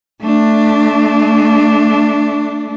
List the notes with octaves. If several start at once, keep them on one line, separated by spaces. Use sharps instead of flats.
A3 D4